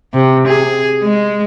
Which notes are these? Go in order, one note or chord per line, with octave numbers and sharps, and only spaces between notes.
C3
G#4
G#3